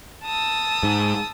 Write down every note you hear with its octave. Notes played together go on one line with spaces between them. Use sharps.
A5 D#6 E6
G#2